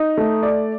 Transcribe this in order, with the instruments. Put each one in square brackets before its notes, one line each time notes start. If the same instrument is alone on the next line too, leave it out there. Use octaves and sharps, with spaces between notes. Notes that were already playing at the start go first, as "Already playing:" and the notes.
Already playing: [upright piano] D#4
A3
D5